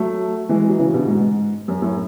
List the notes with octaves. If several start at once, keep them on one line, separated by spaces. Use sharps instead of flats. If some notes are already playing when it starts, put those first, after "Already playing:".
Already playing: F#3 A3
E3 G#3
F#3
C#3 E3
B2 D3
G#2
F#2
F#2 A2